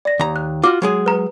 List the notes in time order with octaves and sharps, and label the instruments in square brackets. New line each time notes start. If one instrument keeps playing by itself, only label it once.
[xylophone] D5 A#6
[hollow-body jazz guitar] D#2 A#5
[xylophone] F#6
[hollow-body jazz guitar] F4 F#4 [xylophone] D6 F6
[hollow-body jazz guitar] F#3 G#3 G#4
[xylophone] B4 A#5